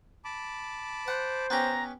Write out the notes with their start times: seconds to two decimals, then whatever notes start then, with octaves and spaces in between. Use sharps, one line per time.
0.25 A5 B5 D6
1.08 C5 F#5
1.50 B3 C#4 G4 A#5